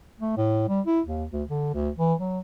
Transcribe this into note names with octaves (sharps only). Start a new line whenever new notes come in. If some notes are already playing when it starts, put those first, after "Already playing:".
A3
A2
G3
E4
D#2
D2
D3
D2
E3
F#3